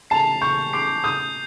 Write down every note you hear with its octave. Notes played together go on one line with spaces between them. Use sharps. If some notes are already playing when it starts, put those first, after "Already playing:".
A5 C7 F7
C#6 G6
D6 C7 F7
D#6 G6